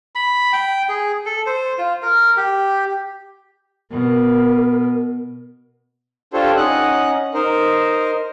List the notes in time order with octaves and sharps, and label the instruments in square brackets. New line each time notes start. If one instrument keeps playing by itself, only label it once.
[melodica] B5
G5
G#4
A4
C5
F4
A#4
G4
[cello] B2 [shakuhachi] A#4
[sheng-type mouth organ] D4 F4 G4 A4 C5 C#5
C#4 D#4 F#5 F#6
D#4 A#4 C5